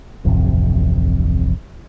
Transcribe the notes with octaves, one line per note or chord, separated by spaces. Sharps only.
D1 A1 F2 C3